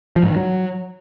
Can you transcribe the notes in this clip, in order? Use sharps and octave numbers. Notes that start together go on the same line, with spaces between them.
F3
G#2
D#3
F#3